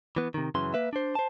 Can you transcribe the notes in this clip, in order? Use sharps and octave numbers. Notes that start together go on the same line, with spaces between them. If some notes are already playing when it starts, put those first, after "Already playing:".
E3 B3
C3 D#3
F#2 C#3 E3 C6
A#3 B4 E5
D4 C5
C5 A5